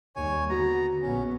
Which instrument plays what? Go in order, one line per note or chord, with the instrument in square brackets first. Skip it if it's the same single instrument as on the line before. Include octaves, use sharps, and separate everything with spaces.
[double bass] D#2 G3 [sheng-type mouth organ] C#5 G#5
[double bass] D3 [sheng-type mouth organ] B3 A#5 [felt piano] F#4
[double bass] A#1 B3 [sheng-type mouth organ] C#4